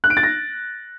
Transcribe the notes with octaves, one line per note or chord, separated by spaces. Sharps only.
F#6
D7
A6
A#6